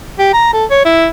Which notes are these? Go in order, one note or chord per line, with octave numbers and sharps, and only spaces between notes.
G4
A#5
A4
C#5
E4